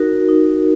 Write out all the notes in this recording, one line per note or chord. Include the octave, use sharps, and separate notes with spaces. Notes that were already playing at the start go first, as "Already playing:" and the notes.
Already playing: D#4 F#4 A#4
D#4